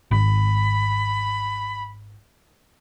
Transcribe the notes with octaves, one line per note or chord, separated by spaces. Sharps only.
G#1 B5